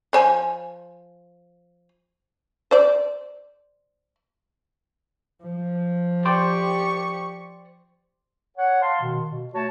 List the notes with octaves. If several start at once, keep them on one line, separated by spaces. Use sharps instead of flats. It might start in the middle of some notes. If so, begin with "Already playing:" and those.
F3 C5 G#5
C5 D5
F3
G4 C5 D5 G5 C#6
C#5 F#5
F5 A5 C6
B2 D#3
B2
A3 F#4 C#5 A5